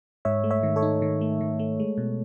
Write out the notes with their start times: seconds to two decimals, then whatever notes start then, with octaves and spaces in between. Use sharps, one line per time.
0.25 G#2 C#5 E5
0.44 A3
0.51 C#5 E5
0.63 D#3
0.76 A4 C#5
0.83 D#4
1.02 D#3
1.21 A3
1.41 D#3
1.59 A3
1.80 G#3
1.98 B2